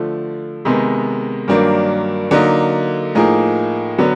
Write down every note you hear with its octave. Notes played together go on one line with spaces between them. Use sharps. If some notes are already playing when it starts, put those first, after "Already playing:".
Already playing: D3 F3 A3
C3 D#3 G#3 B3
G2 D#3 F#3 A#3 D4
D3 F#3 A#3 D#4
A2 F3 A#3 D#4 G#4
D3 F#3 B3